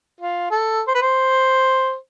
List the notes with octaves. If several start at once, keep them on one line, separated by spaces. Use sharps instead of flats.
F4
A4
C5
B4
C5